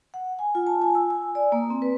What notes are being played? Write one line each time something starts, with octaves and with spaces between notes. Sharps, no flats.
F#5
G#5
F4
A5
G#5
E6
G#5
D5
A#3
C4
B4